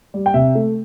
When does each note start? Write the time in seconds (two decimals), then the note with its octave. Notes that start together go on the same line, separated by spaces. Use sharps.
0.14 G3
0.26 G5
0.34 C3 E5
0.55 A3